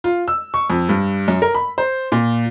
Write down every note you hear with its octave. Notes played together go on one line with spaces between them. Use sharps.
F4
E6
C#6
F2
G2
F#2
A#4
B5
C5
A#2